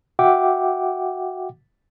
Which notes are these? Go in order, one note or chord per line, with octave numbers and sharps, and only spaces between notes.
F#4 E5 F#5 G5 D6